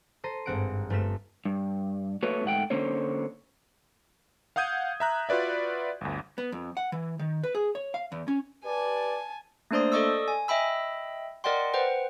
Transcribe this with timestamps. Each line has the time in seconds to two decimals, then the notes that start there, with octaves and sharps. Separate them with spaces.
0.24 A4 C5 A#5 C7 D#7
0.46 G#1 G2 C4 F#5 C#7 D7
0.90 G1 A3 C4 F6 B6 E7
1.45 G2
2.23 A3 A#3 F#4 B4 C#5
2.44 G#2 A3 F#5 G5
2.70 D3 A#3 C#4 C5 C#5
4.56 F5 F#5 D#6 G6 G#6 D#7
5.00 E5 A#5 F#6
5.29 F4 F#4 B4 D5 E5
6.01 G1 D2
6.38 B3
6.52 F2
6.77 F#5
6.92 E3
7.19 D#3
7.44 B4
7.55 G#4
7.75 C#5
7.94 F5
8.12 E2
8.28 C#4
8.64 G4 B4 D5 G#5 A5
9.71 A3 A#3 D4 C5 D5 D#6
9.92 A4 D5 D#5 C#6 D#6 E6
10.28 G#5
10.48 D#5 E5 G5 B5 E6
11.44 A#4 D5 D#5 F#5 G5 C6
11.74 B4 C5 F#5 G5